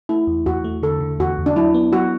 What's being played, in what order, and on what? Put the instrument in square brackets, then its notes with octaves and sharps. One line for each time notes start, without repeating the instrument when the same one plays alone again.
[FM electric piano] A3 [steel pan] E4
[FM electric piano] E2
[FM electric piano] E2 [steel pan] F#4
[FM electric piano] A3
[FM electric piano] D3 [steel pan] A4
[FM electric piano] D3
[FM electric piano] E2 [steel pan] F#4
[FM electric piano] E2
[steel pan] D4
[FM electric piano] F#3 [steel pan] E4
[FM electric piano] B3
[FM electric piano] F#3 [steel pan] F#4